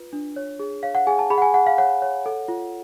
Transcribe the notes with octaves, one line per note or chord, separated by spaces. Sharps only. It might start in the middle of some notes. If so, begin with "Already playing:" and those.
Already playing: F4 B4
D4
C#5
G#4
C#5 F5
F#5
G#4 G#5
A5
G#4 B5
F#5
G#5
G#4 F#5
F5
C#5 F#5
C#5
A4
F4